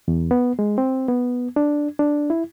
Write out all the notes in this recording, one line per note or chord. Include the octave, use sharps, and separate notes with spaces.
E2
B3
G#3
C4
B3
D4
D4
E4